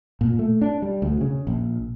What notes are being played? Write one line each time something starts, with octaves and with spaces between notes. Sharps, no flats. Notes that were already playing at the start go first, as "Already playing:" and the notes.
A#2
A3
D4
G3
D2
C#3
A#1